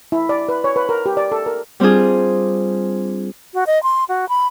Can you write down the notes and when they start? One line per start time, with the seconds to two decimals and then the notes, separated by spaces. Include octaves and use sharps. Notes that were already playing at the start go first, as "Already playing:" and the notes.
0.12 E4
0.29 D5
0.49 B4
0.64 C#5
0.76 B4
0.89 A#4
1.06 G4
1.17 D5
1.32 A4
1.46 A#4
1.80 G3 C4 D4 F4 G#4
3.54 F#4
3.67 D#5
3.83 C6
4.09 F#4
4.29 B5